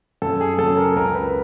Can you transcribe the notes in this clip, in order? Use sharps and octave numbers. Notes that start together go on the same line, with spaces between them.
F#2 A4
G#4
G#4
C#3 F#3 A4
A#4
C#2 A#4
B4